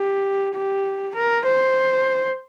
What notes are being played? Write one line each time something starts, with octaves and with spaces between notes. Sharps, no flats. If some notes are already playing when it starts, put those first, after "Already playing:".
Already playing: G4
G4
A#4
C5